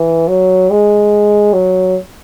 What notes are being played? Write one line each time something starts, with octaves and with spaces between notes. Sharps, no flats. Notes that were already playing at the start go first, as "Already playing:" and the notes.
Already playing: E3
F#3
G#3
F#3